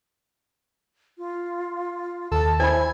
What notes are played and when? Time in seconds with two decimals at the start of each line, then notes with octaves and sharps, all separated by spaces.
1.18 F4
2.32 D#2 A4 A5
2.60 E4 C5 G#5 B5